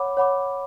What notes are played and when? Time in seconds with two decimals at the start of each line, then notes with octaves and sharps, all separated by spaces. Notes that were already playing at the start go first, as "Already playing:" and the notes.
Already playing: C#5 F#5 B5 D6
0.17 C#5 F#5 B5 D6